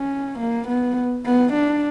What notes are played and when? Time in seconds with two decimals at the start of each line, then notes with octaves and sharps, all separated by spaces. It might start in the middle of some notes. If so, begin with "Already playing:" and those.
Already playing: C#4
0.39 A#3
0.68 B3
1.25 B3
1.53 D4